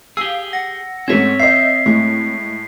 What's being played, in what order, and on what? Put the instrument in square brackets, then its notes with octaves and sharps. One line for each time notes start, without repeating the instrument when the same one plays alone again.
[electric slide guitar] G4 G#4 [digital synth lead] F5 [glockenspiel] E6
[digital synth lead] F#5 [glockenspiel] A#6
[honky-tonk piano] G#2 A3 C#4 [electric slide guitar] C4 C#5 [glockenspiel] G#6 B6
[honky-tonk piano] D#5 E5 [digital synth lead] G6 [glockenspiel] C7
[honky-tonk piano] A2 G#3 [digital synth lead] A3